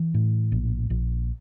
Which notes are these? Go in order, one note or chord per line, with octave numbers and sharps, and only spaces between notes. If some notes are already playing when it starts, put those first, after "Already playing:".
Already playing: E3
A2
A#1
A#1